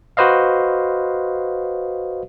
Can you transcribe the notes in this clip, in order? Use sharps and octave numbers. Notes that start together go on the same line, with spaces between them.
F#4 B4 C5 D#5 F5